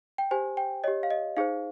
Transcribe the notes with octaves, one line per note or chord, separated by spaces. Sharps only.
G5
G4 C5 G#5
G5
G4 C#5 D#5
F5
D#5
D#4 G#4 C5 F5